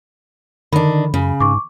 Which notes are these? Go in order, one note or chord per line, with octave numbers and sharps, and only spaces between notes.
D3 D#3 D4 B5
F#2 C#3
G#2 C#6 D6